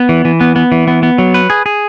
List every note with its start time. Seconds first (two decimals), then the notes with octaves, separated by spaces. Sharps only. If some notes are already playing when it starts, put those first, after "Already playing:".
Already playing: B3
0.09 E3
0.25 E3
0.41 B3
0.56 B3
0.72 E3
0.88 B3
1.03 B3
1.18 F#3
1.34 B4
1.50 G#4
1.66 G#4